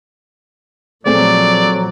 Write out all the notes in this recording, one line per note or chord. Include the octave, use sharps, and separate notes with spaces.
A#2 F3 F#3 A3 C4 G#4 D5